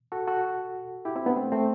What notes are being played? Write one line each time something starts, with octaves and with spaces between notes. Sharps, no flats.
F#4 A4
F#4 A4
E4 G4
C4 E4
B3 D4
A3 C4
A3 C4